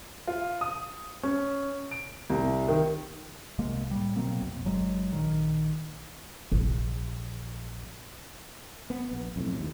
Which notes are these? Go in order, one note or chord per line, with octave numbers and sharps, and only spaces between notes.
F4
D#6
C#4
D7
C2
D#3
C2 C3 G#3 A#3
A2 G3
B2 F#3 A#3 C4
B1 F2
G1 F#3 G#3
A#1 D#3
A#1
B3
A#1
B1 F2 A2
D#2